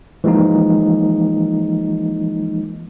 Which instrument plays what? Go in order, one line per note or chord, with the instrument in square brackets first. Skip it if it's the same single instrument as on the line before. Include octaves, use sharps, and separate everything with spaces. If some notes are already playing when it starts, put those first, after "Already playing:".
[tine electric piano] E3 F3 G#3 A#3 D#4